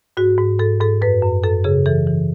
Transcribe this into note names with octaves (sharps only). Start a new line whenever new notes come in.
G#2 F#4
G#2
G#2 A4
G#2 A4
F#2 B4
F#2
F#2 A4
C#3 G#4
E3 A4
E3